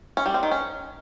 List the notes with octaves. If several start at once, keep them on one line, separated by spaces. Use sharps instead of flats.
C#4
G3
C4
D#3
C#4